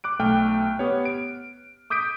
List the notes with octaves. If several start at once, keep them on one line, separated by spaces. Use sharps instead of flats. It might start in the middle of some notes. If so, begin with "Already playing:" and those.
D6 F#6 D7
B1 A3 G5 F6
B3 G4 C#5
D7
D6 D#6 G6 B6 D7